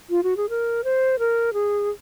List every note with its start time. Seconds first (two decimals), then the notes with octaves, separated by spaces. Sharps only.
0.10 F4
0.23 F#4
0.37 G#4
0.49 A#4
0.84 C5
1.19 A#4
1.53 G#4